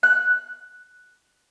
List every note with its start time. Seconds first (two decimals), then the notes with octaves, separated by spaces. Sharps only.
0.03 F#6